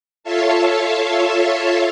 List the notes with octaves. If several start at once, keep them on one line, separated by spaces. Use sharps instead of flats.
F4 A4 C#5 E5 F5 A5